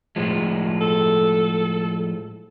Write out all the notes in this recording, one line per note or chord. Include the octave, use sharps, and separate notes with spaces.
A2 F3 G#3
A4